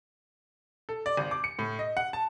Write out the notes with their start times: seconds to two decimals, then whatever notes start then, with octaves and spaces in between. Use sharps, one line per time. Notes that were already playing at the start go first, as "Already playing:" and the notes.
0.89 A4
1.06 D5
1.17 G#1
1.31 D6
1.44 C#7
1.59 A2
1.79 D#5
1.97 F#5
2.13 A5